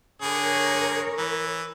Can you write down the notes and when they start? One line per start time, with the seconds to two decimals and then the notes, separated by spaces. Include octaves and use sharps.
0.22 D3 G#4 A#4 C#5
1.18 E3